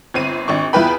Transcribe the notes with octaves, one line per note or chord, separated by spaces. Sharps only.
G1 C4 D#7
G#1 D4 C#6
E2 E4 F4 B4 G5 B5